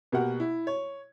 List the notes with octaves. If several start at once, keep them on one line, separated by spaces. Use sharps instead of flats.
B2 A#3 G4 A#4 F#5
E4
C#5